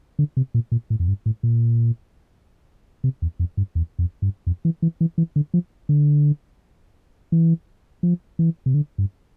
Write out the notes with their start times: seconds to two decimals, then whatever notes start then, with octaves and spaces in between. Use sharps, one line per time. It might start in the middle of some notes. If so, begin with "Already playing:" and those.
0.19 D3
0.37 C3
0.54 A#2
0.72 A#2
0.90 A2
1.00 F2
1.08 G2
1.26 A2
1.43 A#2
3.04 C3
3.22 E2
3.39 F2
3.57 G2
3.75 E2
3.99 F2
4.22 G2
4.47 F2
4.65 E3
4.82 E3
5.01 E3
5.18 E3
5.36 D3
5.54 F3
5.89 D3
7.32 E3
8.03 F3
8.39 E3
8.66 C3
8.74 D3
8.98 G2